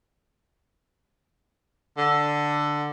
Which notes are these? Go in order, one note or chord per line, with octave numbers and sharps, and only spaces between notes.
D3